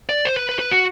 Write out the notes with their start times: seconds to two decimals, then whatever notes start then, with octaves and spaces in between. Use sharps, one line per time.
0.09 D5
0.25 C5
0.37 B4
0.49 B4
0.59 B4
0.71 F#4